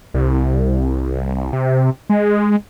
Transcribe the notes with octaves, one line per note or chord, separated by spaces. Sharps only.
C2
C3
G#3